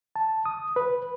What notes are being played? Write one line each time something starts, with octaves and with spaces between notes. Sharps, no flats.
A5
D#6
B4